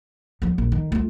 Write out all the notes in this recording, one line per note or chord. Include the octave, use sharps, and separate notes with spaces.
E2 F3
A#1
D#3
A3 F4